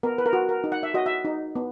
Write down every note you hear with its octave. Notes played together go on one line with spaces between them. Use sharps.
B3 A#4
B4
A#4
F#4
A#4
D#4
F#5
E5
F#4 D#5
E5
D#4
B3